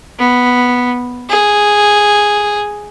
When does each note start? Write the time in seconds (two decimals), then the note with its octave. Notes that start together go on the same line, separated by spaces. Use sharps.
0.19 B3
1.30 G#4